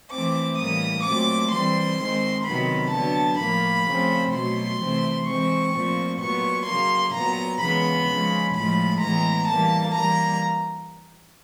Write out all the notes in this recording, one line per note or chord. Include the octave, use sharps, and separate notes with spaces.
E3 A3 C4 D6
A2 E3 G3 A#3 D#6
A#2 F#3 A3 C4 D6
E3 G3 C4 C6
D#3 G#3 C4
C3 D#3 F#3 B3 B5
D3 F#3 B3 A5
A2 F3 A#3 B5
C#3 F3 A3 C4
B2 F#3 A3 C6
C3 E3 A3 C4
E3 G#3 C4 C#6
A#2 F3 A3 C4
A#2 F#3 B3 C#6
C#3 F#3 A#3 C6
A#2 F#3 B3 A#5
C#3 E3 G#3 B3 B5
C#3 F3 G#3
A2 F3 G#3 B5
A2 E3 G#3 B3 A#5
E3 G3 A#3 A5
E3 G3 A#3 A#5